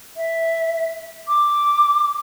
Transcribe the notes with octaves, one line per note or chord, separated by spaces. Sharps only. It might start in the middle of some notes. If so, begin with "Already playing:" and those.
E5
D6